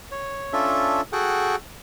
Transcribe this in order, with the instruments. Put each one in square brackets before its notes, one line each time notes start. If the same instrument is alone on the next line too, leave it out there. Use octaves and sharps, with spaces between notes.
[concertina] C#5
C#4 D4 F4 A4 E5
F#4 G#4 A4 F#5 G5